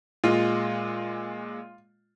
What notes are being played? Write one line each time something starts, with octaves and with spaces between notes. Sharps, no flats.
A#2 G#3 F4 D#5